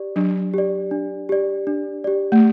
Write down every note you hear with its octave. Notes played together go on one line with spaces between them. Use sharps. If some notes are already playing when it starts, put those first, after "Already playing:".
Already playing: G4 D5
F#3 D4
G4 D5
D4
G4 D5
D4
G4 D5
A3